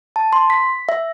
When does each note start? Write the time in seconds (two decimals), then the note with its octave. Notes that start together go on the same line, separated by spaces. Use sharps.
0.16 A5
0.33 C6
0.50 B6
0.89 E5